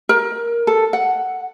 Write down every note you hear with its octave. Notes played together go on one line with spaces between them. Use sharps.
A#4
A4
F#5